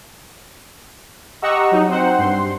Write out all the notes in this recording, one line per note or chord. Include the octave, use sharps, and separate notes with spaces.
G4 D#5 F#5 A#5 C#6 E6
F#3 D#4
C4 C5 F#5
G2 C6